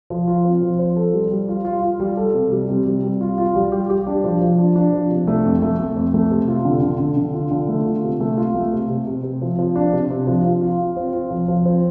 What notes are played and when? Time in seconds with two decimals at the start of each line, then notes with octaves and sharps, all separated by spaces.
0.10 F3
0.27 F4
0.45 C4
0.62 F3
0.79 C5
0.96 A4
1.13 G3
1.31 G3
1.49 F4
1.65 F4
1.82 F4
2.00 G3
2.17 A4
2.34 C3
2.51 G3
2.69 C3
2.86 G3
3.03 G3
3.21 F4
3.38 F4
3.55 G3
3.72 G4
3.90 G4
4.07 D4
4.24 F3
4.41 F3
4.59 D4
4.76 D4
4.93 F3
5.10 C3
5.27 A3
5.45 F2
5.62 A3
5.79 A3
5.97 F2
6.14 A3
6.31 C3
6.48 F4
6.65 D3
6.83 D3
7.00 D3
7.17 D3
7.34 F4
7.51 D3
7.68 A3
7.86 F4
8.03 C3
8.20 A3
8.37 F4
8.55 A3
8.73 C3
8.89 C3
9.07 C3
9.23 C3
9.42 F3
9.59 F3
9.76 D4
9.92 C3
10.10 C3
10.27 F3
10.45 F3
10.62 F4
10.79 F4
10.97 C4
11.13 F4
11.31 F3
11.48 F3
11.66 C4